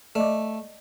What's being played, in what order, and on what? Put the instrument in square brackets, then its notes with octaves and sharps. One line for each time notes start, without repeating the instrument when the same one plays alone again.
[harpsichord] A3 [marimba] D5 D#5 D6